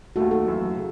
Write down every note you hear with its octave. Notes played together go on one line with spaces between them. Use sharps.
D#2 D#3 A3 F#4
A4
F#2 E3 A3
C#3